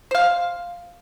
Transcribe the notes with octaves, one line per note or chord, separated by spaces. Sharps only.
C5 F5